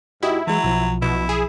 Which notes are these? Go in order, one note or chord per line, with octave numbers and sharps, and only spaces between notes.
G#2 E4 F#4 G4 D#5
E3 F#3 G#3
B1 F3
B2 E4
G#4